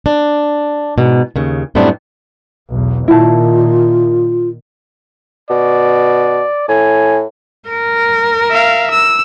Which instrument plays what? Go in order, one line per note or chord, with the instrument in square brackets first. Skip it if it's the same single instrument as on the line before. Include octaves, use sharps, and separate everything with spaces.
[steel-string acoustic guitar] D4
G#2 B2
D#2 C#3
F#2 A2 G3 B3 C4 D4
[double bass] B1 E2
[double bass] A#2 D#3 [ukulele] E4 A5 [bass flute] F4
[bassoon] B2 [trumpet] D5
[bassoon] A2 [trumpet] G#5
[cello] A#4
[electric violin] E5 F5
E6